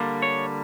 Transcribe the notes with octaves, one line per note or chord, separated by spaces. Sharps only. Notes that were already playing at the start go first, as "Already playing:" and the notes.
Already playing: D3 G3 A#3
C#5